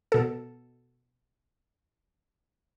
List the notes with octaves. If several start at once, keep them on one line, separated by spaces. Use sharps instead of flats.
B2 A4